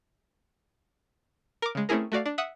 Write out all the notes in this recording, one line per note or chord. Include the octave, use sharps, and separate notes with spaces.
A#4 D6
C#3 G#3
A3 C4 C#4 E4 G#4 A#4
A3 F#4 D5 F5
D4
E5 F#5 D#6